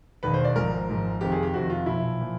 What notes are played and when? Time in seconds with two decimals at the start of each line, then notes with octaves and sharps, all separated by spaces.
0.23 E1 D#2 D#3 B4
0.34 C5
0.44 D5
0.56 G#1 G#2 F3 A#4
0.89 G#1 G#2 F3
1.21 F2 C3 D#3 G4
1.32 G#4
1.43 G4
1.53 F2 C3 D#3 F#4
1.70 F4
1.86 B1 A#2 F3 E4
2.20 A#2 F3